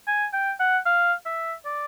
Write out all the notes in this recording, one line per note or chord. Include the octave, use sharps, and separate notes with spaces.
G#5
G5
F#5
F5
E5
D5